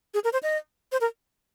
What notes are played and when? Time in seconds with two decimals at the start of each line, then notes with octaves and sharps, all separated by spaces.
0.14 G#4
0.24 A#4
0.33 C5
0.43 D#5
0.92 C5
1.01 A#4